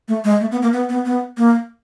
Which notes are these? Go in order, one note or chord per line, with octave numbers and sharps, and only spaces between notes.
A3
G#3
A3
B3
A#3
B3
B3
B3
A#3